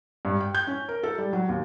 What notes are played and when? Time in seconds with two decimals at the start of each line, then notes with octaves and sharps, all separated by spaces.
0.25 G2
0.40 G5
0.55 G6
0.67 C#4
0.89 A#4
1.03 A4
1.18 G3
1.33 F#3
1.49 D#2